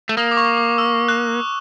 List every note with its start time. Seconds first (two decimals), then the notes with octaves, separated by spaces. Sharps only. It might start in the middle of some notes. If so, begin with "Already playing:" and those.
0.09 A3
0.17 A#3 D#6
0.31 D6
0.37 C#6
0.58 D6
0.78 E6
1.08 F#6